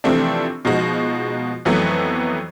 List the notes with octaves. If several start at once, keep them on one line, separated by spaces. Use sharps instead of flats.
C3 E3 F3 A3 C4 D4
B2 F3 G#3 D#4 F#4
F2 E3 F#3 A3 B3